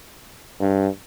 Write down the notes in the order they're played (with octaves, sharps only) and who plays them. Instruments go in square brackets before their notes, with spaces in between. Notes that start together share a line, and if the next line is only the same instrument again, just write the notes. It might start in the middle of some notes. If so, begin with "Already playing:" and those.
[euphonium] G2